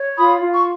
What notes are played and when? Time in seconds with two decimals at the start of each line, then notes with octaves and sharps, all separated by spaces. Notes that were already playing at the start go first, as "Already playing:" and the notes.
Already playing: C#5
0.17 F4 B5 D#6
0.40 F4
0.53 C#6